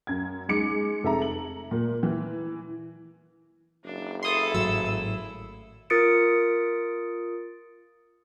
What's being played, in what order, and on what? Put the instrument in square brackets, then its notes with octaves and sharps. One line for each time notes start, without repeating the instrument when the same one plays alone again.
[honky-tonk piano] F#2 G#6
G#3 D#4 D6 C#7
F1 A4 E5 A#5
F#7
A#2
E3
[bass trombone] F#1 [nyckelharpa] D4
[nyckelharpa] E4 A4 [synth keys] C6 D#6
[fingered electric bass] G#1 A2 F#3 [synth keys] E6
[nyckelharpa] E4
[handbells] F4 A#4 D#6 A6 C#7 D7